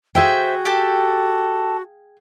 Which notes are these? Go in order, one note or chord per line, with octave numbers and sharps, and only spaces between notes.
F#4 G#4 C5 E5 F5 G5
G4 A4 A5